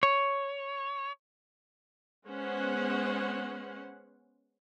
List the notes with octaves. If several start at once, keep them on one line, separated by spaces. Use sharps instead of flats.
C#5
G#3 B3 C#4 C5 F#5